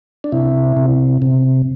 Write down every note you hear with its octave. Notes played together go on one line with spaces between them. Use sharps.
D4
C3 E4
C3
C3